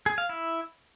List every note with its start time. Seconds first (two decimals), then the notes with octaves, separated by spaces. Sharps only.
0.06 G#4
0.18 F5
0.29 E4